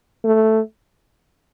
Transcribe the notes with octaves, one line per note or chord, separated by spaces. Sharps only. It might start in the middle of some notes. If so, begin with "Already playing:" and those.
A3